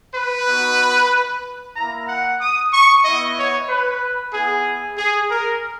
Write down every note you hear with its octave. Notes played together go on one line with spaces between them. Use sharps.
B4
B3 D#4 F#4
A#3 E4 A#5
F#5
D#6
C#6
B3 E4 D#5
C#5
B4
B3 E4 G#4
G#4
A#4